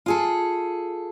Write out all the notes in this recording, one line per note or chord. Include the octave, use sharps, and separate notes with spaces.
F4 G#4 A4